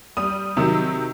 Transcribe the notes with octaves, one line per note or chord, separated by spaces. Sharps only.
G3 D#6
C3 D#3 F#3 E6